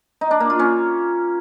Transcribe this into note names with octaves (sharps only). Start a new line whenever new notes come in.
D#4
D4
A#3
F4
C#4